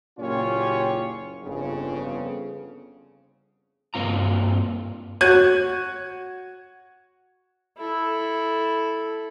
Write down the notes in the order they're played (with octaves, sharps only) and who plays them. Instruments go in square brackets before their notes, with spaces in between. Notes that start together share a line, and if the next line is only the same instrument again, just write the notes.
[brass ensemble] F#1 A#2 C#4 F4 G4 C#5
G1 F2 C#3
[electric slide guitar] G2 A#3 C4 F4 A#5
[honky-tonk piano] F#4 C#5 F#6 G#6 D#7
[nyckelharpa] E4 A4